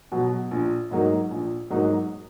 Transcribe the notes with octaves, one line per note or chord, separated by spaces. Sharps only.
B2 F#3
A#1
G#2 F#3 A#3 D#4
A#1
G#2 F#3 A#3 D#4